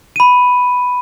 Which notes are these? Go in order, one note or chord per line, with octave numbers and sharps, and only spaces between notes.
B5 D#7